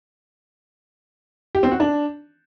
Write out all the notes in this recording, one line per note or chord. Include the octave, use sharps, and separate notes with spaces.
G4
C4
F#4
D4